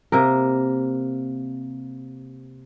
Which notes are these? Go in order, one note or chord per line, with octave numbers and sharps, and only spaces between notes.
C3 A#3 A#4